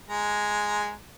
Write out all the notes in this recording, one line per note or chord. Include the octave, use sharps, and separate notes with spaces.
G#3 A#5